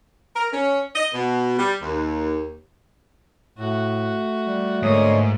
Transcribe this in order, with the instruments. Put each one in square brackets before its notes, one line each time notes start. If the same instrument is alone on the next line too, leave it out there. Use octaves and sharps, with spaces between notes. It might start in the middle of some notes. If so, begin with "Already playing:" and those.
[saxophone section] A#4
C#4
D#5
B2
G3
D#2
[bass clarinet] A2 [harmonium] A3 [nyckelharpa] F#4
[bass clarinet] G3
[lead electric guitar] G#2 [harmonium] D3 C#5 D#5 [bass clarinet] A3 [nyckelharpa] A#3 D#6